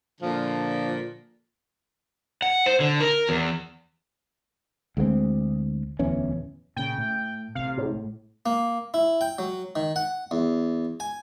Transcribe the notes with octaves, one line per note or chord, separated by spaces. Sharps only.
A#2 D3 F3
F#5
C5
D3
A#4
E2
D2 G#3 A#3 C4
D1 E2 E3 C#4
A#2 C#3 G5
A2
A1 C3 F5
A2
A#3
E4
G5
F#3
D#3
F#5
E2
G#5